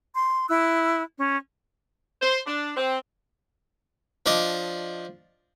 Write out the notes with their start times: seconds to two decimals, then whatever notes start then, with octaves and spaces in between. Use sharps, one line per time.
0.14 C6
0.49 E4 E6 F#6
1.19 C#4
2.22 C5
2.46 D4
2.77 C4
4.26 F3 D4 D5 D#5